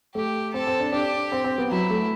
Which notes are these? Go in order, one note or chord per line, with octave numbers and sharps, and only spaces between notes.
A3 G4
C4 A4
C4
D4
D4 G4
C4
C4
B3
F#3 E4
A3